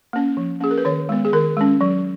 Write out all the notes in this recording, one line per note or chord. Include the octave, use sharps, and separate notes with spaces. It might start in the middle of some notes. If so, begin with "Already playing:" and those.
A#3 C#4
F3
A#3 C#4 G#4
A#4
B4
D#3 C#5
G#3 B3
G#4
D#3 A#4
G#3 C#4
F#3